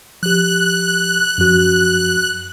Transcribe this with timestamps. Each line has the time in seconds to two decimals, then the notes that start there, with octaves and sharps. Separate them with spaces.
0.23 F3 G4 F#6
1.38 F#2 F3 F#4